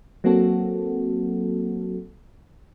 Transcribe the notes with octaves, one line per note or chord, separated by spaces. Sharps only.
F#3 A#3 C4 F#4 A4